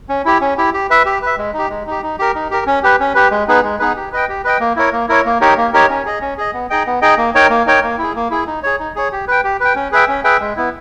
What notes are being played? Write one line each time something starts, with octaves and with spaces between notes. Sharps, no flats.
C#4
E4 G4
C#4
E4 G4
G4
B4 E5
G4
B4 E5
G#3
D#4 G4
G#3
D#4 G4
D#4
G4 A#4
D#4
G4 A#4
C#4
G4 B4
C#4
G4 B4
G#3
B3 D#4 G#4 B4
G#3
B3 D#4 G#4 B4
G4
B4 D#5 G5
G4
B4 D#5 G5
A#3
E4 A#4 C#5
A#3
E4 A#4 C#5
A#3
D#4 G4 A#4 C#5
A#3
D#4 G4 A#4 C#5
C#4
G#4 D#5
C#4
G#4 D#5
B3
D#4 G#4 D#5 G5
B3
D#4 G#4 D#5 G5
A#3
D#4 A#4 C#5 G5
A#3
D#4 A#4 C#5 G5
A#3
E4 G#4
A#3
E4 G#4
D#4
G#4 C#5
D#4
G#4 C#5
G4
B4 G5
G4
B4 G5
C#4
G#4 B4 E5 G5
C#4
G#4 B4 E5 G5
G#3
B3 E4